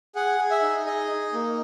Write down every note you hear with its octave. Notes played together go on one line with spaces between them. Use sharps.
G#4 F#5
G#4
E5
D#4
G#4 D#5
D#4
A#3